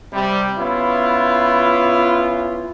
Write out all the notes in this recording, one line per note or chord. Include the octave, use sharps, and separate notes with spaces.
C3 G3
B3 C#4 E4 F4